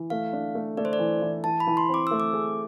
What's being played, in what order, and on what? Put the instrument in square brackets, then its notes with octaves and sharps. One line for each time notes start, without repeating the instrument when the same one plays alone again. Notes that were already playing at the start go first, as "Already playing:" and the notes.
Already playing: [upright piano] E3
[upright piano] A3 [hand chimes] F5
[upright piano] D4
A3
[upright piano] A3 [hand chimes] D5
[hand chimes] C5
D5
[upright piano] E3
E3
[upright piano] E3 [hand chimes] A5
[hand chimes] B5
[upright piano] E3
[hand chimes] C6
[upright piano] C4
[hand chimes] D6
[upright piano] A3 [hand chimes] E6
[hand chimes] D6
[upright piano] G#4